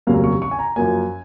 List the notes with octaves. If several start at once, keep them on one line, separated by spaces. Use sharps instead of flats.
F1 D#2 C#3 F#3 A#3 F5
C#6
C#6
G#5
A#5
F#2 F3 A#3 G#5